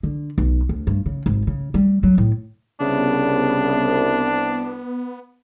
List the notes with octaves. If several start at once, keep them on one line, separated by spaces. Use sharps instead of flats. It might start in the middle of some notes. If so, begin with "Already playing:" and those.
D3
B1
D2
G2
C#3
G#1
C#3
G3
F#3
A2
C2 C#3 B3 D4